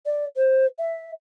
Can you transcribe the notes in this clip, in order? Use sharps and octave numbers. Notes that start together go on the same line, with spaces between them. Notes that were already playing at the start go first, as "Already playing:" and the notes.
D5
C5
E5